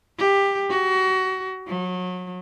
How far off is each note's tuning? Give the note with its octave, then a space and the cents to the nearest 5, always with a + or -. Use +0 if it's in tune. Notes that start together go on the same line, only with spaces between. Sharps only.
G4 +15
F#4 +25
F#3 -30